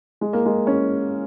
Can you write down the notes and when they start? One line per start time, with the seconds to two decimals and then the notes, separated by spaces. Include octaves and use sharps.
0.21 G#3
0.33 A#3
0.46 G#3
0.67 C#4